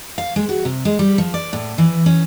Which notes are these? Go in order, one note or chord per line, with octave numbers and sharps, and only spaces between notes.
F5
G#3
F#4
C3
G#3
G3
F3
D5
A2
E3
C#4